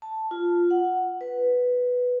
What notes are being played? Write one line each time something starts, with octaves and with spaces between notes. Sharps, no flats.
A5
F4
F#5
B4